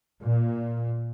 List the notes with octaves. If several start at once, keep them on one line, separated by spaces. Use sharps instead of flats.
A#2